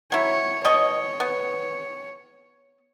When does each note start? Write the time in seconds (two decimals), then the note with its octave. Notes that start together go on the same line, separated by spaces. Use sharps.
0.12 F#3 E4 C#5
0.65 B2 C#5 D#5 C#6
1.20 B3